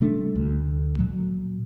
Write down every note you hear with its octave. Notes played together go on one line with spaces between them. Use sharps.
C3 G3 A3 D4
D2
A#2 F#3